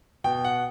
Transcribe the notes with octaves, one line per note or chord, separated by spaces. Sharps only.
B2 G5
F#5